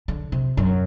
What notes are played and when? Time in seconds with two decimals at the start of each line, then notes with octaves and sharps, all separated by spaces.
0.08 D3
0.32 C3
0.57 F#2